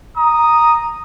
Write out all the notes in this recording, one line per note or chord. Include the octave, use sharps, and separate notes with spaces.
A#5 D#6